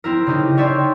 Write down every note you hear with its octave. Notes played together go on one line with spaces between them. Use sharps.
C4 E4 A#4
C#3 D#4 G4
C#4 C#5 D5 E5 G5 C6